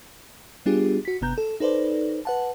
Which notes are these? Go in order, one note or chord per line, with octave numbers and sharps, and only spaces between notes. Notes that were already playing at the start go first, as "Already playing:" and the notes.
G3 B3 D4 F4 G4 G#4
F#4 B6
G1 C3 B3 A#5 G6
A4
D#4 A4 B4 C5 D5
B4 F#5 A5